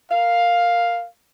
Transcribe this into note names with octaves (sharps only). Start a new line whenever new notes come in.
A#4 F5